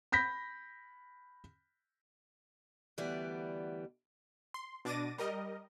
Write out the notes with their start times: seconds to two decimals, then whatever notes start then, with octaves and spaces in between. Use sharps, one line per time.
0.12 B5 G6 A#6 B6
2.98 D2 E3 G3 B3 D5
4.54 C6
4.85 B2 D4 D6 A6 A#6 D#7
5.18 G3 A#4 D#5